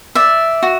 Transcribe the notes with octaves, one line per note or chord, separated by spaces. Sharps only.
D5 E5
F#4